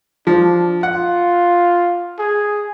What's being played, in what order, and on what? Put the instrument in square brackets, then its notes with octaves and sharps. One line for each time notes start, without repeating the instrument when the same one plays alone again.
[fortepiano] F3 [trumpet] D4
[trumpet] F4 [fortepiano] F#5
[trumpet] G#4